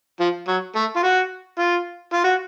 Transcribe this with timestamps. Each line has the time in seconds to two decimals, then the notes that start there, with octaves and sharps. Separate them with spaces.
0.20 F3
0.48 F#3
0.75 A3
0.96 F4
1.03 F#4
1.59 F4
2.14 F4
2.24 F#4